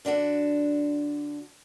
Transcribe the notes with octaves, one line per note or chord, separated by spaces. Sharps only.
D3 D4 F#4 A4